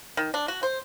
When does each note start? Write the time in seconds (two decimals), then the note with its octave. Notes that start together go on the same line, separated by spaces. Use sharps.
0.17 D#3
0.34 D4
0.48 F#4
0.63 C5